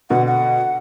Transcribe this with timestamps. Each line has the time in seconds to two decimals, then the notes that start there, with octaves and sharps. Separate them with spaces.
0.10 B2 D3 F#5
0.27 F#5